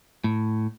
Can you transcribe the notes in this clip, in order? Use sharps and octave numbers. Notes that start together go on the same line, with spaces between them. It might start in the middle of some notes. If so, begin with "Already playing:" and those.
A2